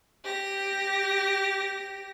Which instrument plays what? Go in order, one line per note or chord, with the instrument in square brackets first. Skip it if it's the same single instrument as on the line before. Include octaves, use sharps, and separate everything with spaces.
[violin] G4 A#6